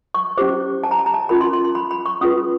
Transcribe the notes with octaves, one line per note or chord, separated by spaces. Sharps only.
C#6
C#4 E4 G4 C5 D6
A5
A#5
A5
A#5
A5
C#4 F4 A#4 B5
C6
C6
C6
B5
B5
C#6
C#4 F4 G#4 B4 D#6